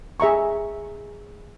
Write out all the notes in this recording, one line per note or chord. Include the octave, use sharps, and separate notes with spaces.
G#4 E5 A#5 C#6